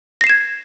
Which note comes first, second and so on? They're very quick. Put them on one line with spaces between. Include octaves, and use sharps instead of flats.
A#6 C7 E7 G#6